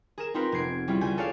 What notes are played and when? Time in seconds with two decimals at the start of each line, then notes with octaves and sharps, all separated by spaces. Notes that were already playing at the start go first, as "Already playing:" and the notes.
0.18 G#4 A#4 E7
0.34 C4 D#4 F4 A#4 B4
0.52 F1 B3 G#6 C7 D7
0.88 G3 C#4 E4 F4
1.01 C#2 G#5 G6
1.17 G#4 A4 C#5 D5 F5